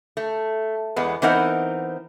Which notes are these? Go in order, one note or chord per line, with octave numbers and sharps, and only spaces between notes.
A3
E2 G#3 B3
E3 B3 C4 D#4 A#4 F#5